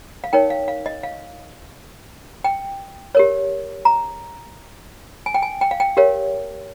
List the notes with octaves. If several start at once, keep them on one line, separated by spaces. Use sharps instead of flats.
F5
D#4 A#4 C#5 G5
F5
F5
D#5
F5
G5
G4 A#4 C#5
A#5
G#5
G5
G#5
G5
F5
G5
G4 A#4 C#5 F5